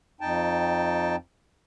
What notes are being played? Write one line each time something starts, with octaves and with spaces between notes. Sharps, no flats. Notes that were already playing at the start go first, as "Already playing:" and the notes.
F2 D#4 G5 A5